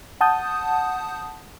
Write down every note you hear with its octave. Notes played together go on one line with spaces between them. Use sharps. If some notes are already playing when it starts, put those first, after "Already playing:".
F#5 A5 D#6 G6